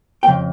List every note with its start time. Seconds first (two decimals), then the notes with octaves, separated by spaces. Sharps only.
0.23 G5
0.27 F2 C#3